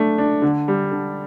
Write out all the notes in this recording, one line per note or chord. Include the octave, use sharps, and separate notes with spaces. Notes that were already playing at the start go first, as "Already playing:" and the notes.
Already playing: A3 D4
D4
D3
G3
D3